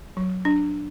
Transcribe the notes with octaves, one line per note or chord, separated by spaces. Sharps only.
F#3
D4